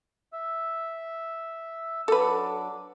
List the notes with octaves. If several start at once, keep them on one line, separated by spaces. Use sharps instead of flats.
E5 E6
F#3 D4 A4 B4 D6